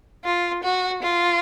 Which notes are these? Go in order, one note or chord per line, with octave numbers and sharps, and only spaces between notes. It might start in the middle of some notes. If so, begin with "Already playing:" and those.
F4
F#4
F4